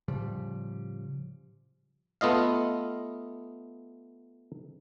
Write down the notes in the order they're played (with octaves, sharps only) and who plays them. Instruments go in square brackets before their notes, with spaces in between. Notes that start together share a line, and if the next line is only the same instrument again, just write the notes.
[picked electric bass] A2 C#3 F3 G3
[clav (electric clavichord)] A3 B3 F4 D#5 F5